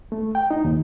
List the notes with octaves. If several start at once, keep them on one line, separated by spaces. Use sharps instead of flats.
A3
G5
D#4
D#2